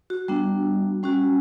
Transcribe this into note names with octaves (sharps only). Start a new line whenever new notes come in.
F#4
G3 B3 D4
G3 C#4 F#4